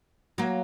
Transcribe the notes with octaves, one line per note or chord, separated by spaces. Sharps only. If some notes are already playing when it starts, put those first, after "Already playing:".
F#3 A#3